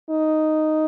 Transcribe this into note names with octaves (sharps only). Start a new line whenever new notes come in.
D#4